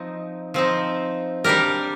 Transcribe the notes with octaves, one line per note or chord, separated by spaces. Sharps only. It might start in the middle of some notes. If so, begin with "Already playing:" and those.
Already playing: F3 C4 D#4
F3 C4 D#4
G3 D4 G4 A#4